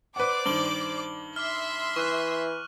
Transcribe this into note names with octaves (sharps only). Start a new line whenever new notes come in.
B4 C5 D5 F#5 D6
G2 D#3 F#7 G7
E5 C6 D6 F6
E3 C#6 F#6